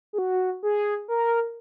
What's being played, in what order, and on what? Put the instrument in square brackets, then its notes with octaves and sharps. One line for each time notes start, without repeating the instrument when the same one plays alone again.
[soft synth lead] G#4
F#4
G#4
A#4